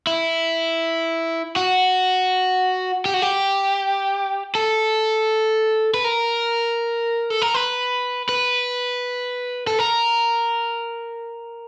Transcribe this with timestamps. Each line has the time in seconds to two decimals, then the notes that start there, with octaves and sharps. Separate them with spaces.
0.07 E4
1.56 F#4
3.05 G4
3.14 F#4
3.22 G4
4.55 A4
5.94 B4
6.04 A#4
7.30 A4
7.42 A#4
7.54 B4
8.29 B4
9.67 A4
9.79 A#4